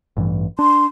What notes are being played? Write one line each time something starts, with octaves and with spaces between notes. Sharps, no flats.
A1 G2 E3
D4 C6